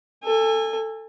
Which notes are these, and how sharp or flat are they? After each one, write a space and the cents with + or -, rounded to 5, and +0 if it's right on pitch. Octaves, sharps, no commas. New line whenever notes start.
A4 +15 G#5 -25